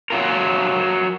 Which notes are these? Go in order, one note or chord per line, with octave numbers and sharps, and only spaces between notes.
F#3 F4 A#4